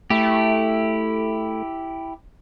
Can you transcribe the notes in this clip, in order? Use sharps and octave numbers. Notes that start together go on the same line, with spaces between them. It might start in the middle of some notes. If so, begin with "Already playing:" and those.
A3 E4 G4